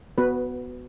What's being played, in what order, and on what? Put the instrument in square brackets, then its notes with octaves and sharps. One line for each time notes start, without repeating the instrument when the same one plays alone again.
[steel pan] B3 F#4 B4